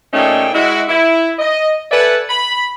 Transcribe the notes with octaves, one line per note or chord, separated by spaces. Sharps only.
A#2 A3 C#4 D#4 G#4 G5
G#3 E4 F#4
E4
D#5
A4 B4 D5 E5 F#5 G#5
B5